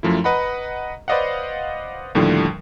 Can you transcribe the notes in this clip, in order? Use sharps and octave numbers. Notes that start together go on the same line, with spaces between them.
F#2 F3 A3 E4
B4 D#5 F#5 A#5 B5
B4 C5 D5 D#5 F5 F#5
D#2 A2 D3 F3 G3